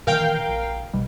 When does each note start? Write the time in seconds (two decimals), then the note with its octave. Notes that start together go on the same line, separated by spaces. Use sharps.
0.07 A#2 D#3 E3 A#4 F5 G5
0.48 A#1
0.93 B1 B2 G3